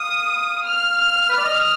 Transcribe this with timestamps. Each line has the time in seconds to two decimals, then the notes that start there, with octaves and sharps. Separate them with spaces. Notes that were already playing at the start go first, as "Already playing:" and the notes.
Already playing: F5 D#6
0.66 F6
1.29 B4
1.37 D5
1.45 D#5